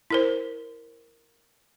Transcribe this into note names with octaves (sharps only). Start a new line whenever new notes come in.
E4 A#4 C5